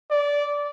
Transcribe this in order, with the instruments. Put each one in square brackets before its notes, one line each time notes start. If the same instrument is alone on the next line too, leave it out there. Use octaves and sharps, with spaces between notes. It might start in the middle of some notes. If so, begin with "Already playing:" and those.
[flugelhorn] D5